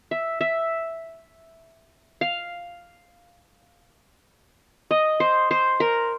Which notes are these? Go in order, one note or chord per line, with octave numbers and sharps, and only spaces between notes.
E5
E5
F5
D#5
C5
C5
A#4